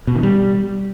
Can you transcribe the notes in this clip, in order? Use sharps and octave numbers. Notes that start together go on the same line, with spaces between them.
B2
D#3
G3